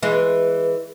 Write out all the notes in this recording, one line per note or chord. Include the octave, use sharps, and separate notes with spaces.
E3 G#3 B4